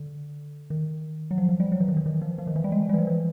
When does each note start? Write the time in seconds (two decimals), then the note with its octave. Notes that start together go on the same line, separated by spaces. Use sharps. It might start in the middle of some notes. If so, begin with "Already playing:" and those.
Already playing: D3
0.70 D#3
1.31 F#3
1.38 F3
1.49 F3
1.60 G3
1.72 F#3
1.80 E3
1.88 D#3
1.97 E3
2.06 D#3
2.22 F3
2.38 F3
2.47 D#3
2.56 E3
2.64 G3
2.72 G#3
2.89 G3
2.94 E3
2.98 F3
3.07 E3